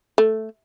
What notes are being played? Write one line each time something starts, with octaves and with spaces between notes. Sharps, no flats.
A3